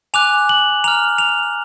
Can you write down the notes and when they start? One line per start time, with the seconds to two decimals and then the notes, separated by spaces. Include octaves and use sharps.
0.14 G#5 D6 F#6 F7
0.49 F#7
0.84 A#5 F6 F7
1.18 F7